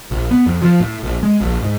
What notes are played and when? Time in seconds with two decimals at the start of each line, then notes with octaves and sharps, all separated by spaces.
0.11 A#1
0.31 B3
0.46 F2
0.62 F3
0.80 A2
1.03 A#1
1.23 G#3
1.41 A#1
1.63 G#2